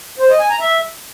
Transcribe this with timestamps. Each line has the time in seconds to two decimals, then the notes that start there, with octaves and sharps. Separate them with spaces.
0.19 C5
0.29 D#5
0.40 G#5
0.50 A#5
0.60 E5